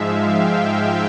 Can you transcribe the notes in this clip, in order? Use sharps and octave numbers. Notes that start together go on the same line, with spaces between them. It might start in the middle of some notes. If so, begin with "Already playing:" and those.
Already playing: G#2 F3 G#3 E5 F5
G5
G5